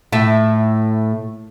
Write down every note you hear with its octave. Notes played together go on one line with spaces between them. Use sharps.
A2 E5